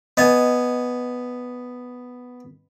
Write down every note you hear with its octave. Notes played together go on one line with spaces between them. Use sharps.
B3 D#5 G#5